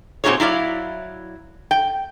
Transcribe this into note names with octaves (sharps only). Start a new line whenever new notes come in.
A#2 C4 D#4 F#4 G#4 C#5
F#3 E4 D5 F5
G5